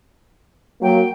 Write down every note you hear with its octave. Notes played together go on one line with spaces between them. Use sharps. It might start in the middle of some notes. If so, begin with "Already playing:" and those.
F#3 A#3 G5